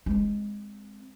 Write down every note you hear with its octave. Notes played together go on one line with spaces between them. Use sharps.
G#3 C4